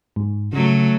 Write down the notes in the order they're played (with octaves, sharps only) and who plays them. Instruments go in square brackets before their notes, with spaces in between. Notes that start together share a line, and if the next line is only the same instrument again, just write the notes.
[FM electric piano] G#2
[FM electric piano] C#3 [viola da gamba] F#3 A3